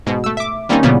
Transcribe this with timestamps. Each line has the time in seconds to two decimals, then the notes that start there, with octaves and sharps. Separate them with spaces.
0.06 G#2 B2
0.24 A3 E6
0.37 E5 D6
0.69 D#3 G3 A#3 C4 C#4 D#4
0.83 A#2 C#3 E3 G3 A#3 B3